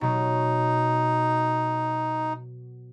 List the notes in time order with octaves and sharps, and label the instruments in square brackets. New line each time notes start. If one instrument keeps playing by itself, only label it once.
[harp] B2 F#3 [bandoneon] D#4